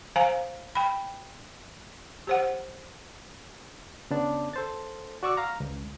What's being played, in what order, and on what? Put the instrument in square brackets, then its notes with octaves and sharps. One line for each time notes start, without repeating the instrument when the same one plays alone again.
[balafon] C5 F5 G#5 A#5
G5 B5
G4 C5 F#5
[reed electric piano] C#3 B3 D4
A4 C5 A6
F#4 D5 C#6 D6 E6
F5 A#5
C#2